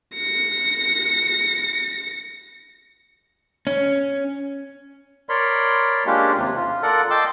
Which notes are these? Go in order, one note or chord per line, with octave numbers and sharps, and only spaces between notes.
A#6 C#7
C#4
A#4 C#5 D5 B5 C6
G#3 A#3 C#4 D4 F4 G4
D#2 C3
F4
F4 A4 A#4 D5 F#5
D#5 G5 A5 C6 D6 E6